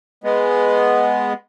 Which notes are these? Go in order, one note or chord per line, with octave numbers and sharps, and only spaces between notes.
G#3 B3